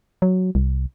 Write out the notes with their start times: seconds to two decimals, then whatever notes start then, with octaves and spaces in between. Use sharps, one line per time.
0.22 F#3
0.55 C2